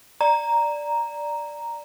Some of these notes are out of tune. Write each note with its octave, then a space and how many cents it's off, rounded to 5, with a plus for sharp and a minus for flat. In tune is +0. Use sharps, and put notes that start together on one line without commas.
D5 +0 A#5 +0